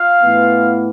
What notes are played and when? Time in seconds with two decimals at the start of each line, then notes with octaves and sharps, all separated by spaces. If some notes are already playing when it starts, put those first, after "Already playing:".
Already playing: F4 F5
0.23 A2 E3 B3